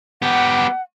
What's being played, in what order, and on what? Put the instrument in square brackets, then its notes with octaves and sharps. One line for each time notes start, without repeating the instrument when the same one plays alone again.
[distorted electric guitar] B3 G4 [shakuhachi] F#5